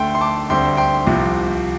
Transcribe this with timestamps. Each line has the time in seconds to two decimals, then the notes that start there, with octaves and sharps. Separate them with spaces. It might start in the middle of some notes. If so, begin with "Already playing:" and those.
Already playing: D2 D3 A3 G5 C6
0.15 C6
0.21 A5 D6
0.50 D2 D3 G3 C4 G5 C6
0.77 G5 C6
1.06 C2 C3 F3